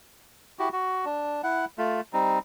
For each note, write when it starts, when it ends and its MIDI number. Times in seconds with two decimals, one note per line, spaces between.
0.59 0.69 64
0.59 0.69 66
0.59 0.69 67
0.73 1.05 66
1.05 1.42 62
1.44 1.65 64
1.44 1.65 78
1.78 2.01 57
1.78 2.01 65
2.13 2.39 55
2.13 2.39 60
2.13 2.39 63